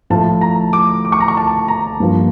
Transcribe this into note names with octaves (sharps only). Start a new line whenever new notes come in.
A2 F3 A3 A5
A#5
D6
D6
C#6
A#5
C#6
A5
A#5
G2 F3 A#3